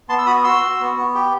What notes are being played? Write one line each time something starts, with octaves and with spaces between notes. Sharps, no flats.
B3 A5 C6
E6
F#4 B5 D#6
F#4 C6 E6
F#4
B3
B3
G4